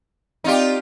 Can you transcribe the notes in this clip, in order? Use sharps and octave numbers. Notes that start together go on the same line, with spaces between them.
C4 D#4 F4 G4 D5 F5